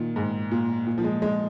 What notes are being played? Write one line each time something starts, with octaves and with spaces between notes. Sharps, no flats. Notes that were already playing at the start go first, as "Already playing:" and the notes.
Already playing: A#2 D#3
G#2
A#2
A#2
F3
G#3
G#3